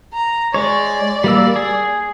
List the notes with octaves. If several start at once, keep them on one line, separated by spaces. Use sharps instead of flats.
A#5
G#3 C#5 D5
G3 A#3 E6
G#4